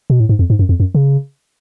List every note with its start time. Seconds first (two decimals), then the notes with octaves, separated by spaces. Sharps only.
0.10 B2
0.20 A2
0.29 G#2
0.39 F2
0.50 G#2
0.59 F#2
0.69 F2
0.80 F#2
0.95 C#3